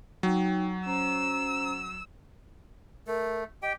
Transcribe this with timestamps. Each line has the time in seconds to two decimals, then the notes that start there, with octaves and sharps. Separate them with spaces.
0.23 F#3 D#4 G5
0.86 C#4 C5 A#5 E6
3.07 A3 A#4
3.63 G4 D#5 G5